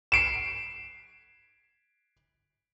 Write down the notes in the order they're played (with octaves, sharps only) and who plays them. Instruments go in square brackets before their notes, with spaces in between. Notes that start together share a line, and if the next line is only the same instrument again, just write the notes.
[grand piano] C7 D7 E7